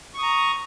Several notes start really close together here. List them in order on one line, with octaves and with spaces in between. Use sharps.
C#6 D#6 A#5